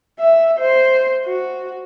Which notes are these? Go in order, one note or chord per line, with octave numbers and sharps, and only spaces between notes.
E5
C5
F#4